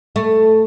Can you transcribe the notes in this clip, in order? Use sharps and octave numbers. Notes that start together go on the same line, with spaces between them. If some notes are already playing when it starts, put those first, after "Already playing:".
A3